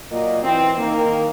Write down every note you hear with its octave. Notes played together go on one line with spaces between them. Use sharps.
A#2 F#3 A#3 D#5
E3 C4
D#3 A#3